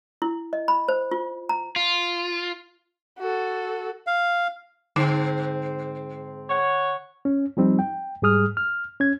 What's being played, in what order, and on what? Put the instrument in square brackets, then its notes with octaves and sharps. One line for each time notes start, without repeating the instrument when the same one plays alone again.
[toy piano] E4
D#5
B5
C5
F4
A#5
[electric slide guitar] F4
[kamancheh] F#4 A4
[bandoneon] F5
[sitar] G#2 C4 [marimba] D3
[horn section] C#5 F#5
[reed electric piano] C#4
F3 G3 C4 D#4
G5
G#2 G3 G#4 D#6 F6
F6
C#4 G#6